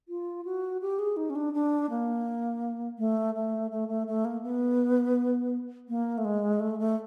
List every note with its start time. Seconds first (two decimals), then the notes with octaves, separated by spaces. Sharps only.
0.08 F4
0.45 F#4
0.82 G4
0.99 G#4
1.17 D#4
1.30 C#4
1.36 D4
1.54 D4
1.90 A#3
2.98 A3
3.35 A3
3.71 A3
3.88 A3
4.07 A3
4.25 A#3
4.43 B3
5.89 A#3
6.18 A3
6.25 G#3
6.60 A3
6.79 A3